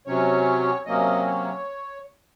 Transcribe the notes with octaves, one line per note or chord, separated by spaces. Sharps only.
C3 F#3 C#4 C#5
C3 F#3 A#3 C#4 D#5
C#5